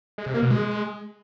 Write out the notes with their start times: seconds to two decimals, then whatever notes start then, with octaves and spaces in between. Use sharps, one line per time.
0.18 G#3
0.26 C3
0.34 A#3
0.43 B2
0.51 G#3